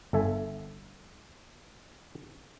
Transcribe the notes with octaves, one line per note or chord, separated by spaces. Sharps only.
G1 A4 E5 G#5